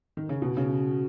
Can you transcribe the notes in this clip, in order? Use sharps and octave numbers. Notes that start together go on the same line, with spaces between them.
D#3
C#3
B2
C#3